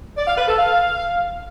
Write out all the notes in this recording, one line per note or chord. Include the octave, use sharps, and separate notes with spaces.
D5
F5
B4
A4
F5